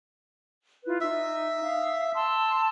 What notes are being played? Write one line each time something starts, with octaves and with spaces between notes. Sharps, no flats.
E4 F4 B4
D#4 E5
F5 D#6
A5 C6 E6